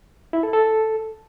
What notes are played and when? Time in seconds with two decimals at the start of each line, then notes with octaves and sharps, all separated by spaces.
0.33 E4
0.43 A4
0.53 A4